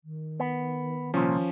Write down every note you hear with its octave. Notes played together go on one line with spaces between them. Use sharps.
D#3
B3
C2 A#2 F3 C#4